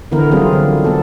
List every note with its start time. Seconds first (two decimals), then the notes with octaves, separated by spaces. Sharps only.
0.12 D3 E3 B3 E4 A#4
0.31 F#3 G3 B3 C4 F4 G#4
0.52 D3
0.84 B3 A4